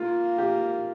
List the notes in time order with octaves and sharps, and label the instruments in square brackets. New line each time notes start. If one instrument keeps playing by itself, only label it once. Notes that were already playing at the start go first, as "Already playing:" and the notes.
Already playing: [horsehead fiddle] A#3 [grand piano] F4
[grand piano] G4